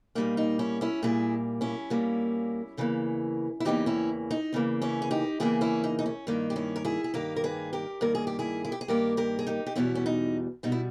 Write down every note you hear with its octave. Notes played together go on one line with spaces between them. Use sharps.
A#2 G3 A#3 D#4
D#4
C#4 E4
C#4 E4
A#2 G3 A#3 E4 G#4
C#4 E4
A#2 G3 A#3
E2 C#3 E3 A#3
E4
E2 C#3 E3 A#3 D#4 G4
C#4 E4
D#4
E2 C#3 E3 A#3
C#4 E4
G#4
D#4 G4
E2 C#3 E3 A#3 E4 G#4
C#4 E4
D#4
D#4
C#4
G2 D#3 A#3 D#4
G4
C#4 E4
A#4
E4 G#4
G#4
G2 D#3 A#3 G4 A#4
A#4
G#4 B4
G4 A#4
G2 D#3 A#3 A#4
G#4
G4
E4 G#4
E4
G4
G#4
G2 D#3 A#3 G4 A#4
G4 A#4
G#4
D#4 G4
G4
E2 B2 G3 C#4 E4
C#4
D#4
B2 G3 D#4
E4